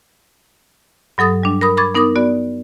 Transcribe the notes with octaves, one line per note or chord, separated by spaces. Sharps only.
G2 F#3 A4 D#6 A6
G3 D4
A#4 B5 D#6
B5 C#6 D6 G#6 A6
B3 D#4 A#4 D6 D#6
B3 F#4 D5